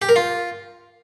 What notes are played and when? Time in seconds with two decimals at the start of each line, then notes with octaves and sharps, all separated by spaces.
0.02 G4
0.09 A#4
0.16 F4